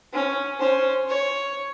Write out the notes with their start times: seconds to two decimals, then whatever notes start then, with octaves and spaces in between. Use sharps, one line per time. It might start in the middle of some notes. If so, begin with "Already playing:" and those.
0.13 C#4
0.59 C#4 C5
1.08 C#5